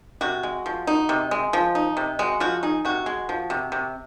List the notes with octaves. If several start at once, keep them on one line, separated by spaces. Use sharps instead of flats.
C3 F#4
G#3
F3
D#4
C3
G#3
F3
D#4
C3
G#3 F#4
F3 F#4
D#4 G#4
C3 F#4
G#3
F3
C3
C3